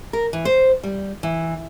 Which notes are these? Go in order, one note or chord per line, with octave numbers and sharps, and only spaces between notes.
A#4
E3
C5
G3
E3